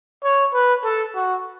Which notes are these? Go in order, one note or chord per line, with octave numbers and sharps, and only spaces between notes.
C#5
B4
A4
F#4